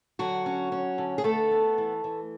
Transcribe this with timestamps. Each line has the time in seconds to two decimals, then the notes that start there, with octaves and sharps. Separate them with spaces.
0.19 D3 F#3 F#4
0.46 C#4
0.72 C#4
0.98 D3
1.18 G#4
1.24 A3 B3 A4
1.51 B3
1.78 E3
2.04 E3